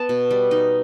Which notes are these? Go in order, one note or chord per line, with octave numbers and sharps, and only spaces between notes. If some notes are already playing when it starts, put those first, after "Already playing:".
Already playing: B3 A5
B2
G3
D#4